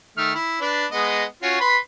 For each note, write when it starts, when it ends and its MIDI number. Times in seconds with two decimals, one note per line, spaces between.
0.17 0.34 51
0.17 0.34 57
0.17 0.34 89
0.35 0.58 64
0.61 0.86 62
0.61 0.86 71
0.92 1.24 56
0.92 1.24 59
0.92 1.24 75
1.43 1.58 61
1.43 1.58 65
1.43 1.58 66
1.60 1.77 71
1.60 1.77 83
1.60 1.77 84